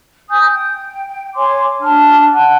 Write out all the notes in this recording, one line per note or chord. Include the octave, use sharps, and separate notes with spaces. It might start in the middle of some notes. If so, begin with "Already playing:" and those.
G#5 D#6 G6
G5
C#5 G#5 C6 D6
D4 A5 F6
F#5 A5 F#6